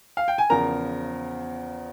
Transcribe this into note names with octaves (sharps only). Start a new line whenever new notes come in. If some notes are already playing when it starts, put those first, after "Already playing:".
F5
G5
G#5
E2 C#3 F3 A#4 A#5